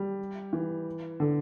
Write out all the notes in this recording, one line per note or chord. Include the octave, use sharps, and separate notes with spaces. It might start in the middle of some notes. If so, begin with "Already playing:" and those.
Already playing: G3
E3
D3